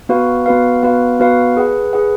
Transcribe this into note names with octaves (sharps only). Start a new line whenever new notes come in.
B3 F#4 B4 F5
B3 F#4 B4 F5
B3 F#4 B4 F5
B3 F#4 B4 F5
G#4 B4 F#5
G#4 B4 F#5